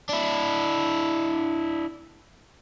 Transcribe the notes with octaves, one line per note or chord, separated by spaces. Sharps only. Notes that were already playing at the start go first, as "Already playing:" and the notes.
D4 E4